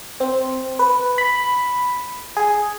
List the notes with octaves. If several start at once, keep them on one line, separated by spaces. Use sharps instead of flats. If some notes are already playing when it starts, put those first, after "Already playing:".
C4
B4
B5
G#4